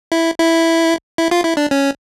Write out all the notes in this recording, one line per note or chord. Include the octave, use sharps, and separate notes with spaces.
E4
E4
E4
F4
E4
D4
C#4